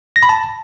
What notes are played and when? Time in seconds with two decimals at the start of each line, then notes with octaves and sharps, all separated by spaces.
0.16 A#6
0.23 B5
0.29 A5